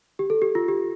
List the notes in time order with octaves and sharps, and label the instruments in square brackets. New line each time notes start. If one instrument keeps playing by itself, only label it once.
[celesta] G4
A4
G4
F4
G4